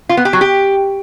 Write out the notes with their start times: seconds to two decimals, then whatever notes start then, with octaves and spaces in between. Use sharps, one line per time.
0.09 F4
0.17 B3
0.25 G4
0.33 F#3
0.41 G4